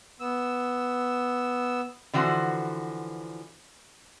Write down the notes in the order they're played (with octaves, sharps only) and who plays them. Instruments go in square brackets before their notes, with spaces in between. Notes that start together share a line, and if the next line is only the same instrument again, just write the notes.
[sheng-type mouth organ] B3 E6
[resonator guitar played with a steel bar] D3 E3 F3 F#4 C5